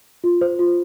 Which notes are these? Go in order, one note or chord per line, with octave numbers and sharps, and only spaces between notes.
F4
C5
F4